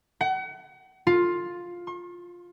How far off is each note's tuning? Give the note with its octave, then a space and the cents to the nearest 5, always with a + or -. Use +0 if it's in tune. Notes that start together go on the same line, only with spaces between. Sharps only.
F#5 +35
F4 +10
C6 +45